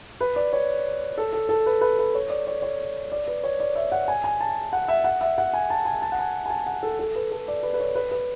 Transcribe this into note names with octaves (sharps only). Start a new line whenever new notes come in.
B4
D5
C#5
A4
A4
A4
B4
B4
B4
C#5
D5
C#5
C#5
D5
B4
C#5
D5
E5
F#5
G#5
G#5
A5
F#5
E5
F#5
E5
F#5
G#5
A5
G#5
A5
F#5
G#5
G#5
A5
F#5
A4
A4
B4
A4
D5
B4
B4
C#5
B4
B4